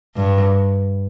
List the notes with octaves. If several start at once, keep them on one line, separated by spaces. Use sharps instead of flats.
G2